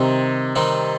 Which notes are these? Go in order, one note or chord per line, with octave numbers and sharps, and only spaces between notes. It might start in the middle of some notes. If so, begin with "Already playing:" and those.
Already playing: C3 D#3 G3 C4 D#4
D#3 G3 C4 D#4